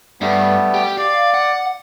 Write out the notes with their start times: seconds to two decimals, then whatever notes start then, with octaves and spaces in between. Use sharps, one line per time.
0.21 G2 G3 A3 B3
0.74 G4
0.98 D5 F5
1.34 F#5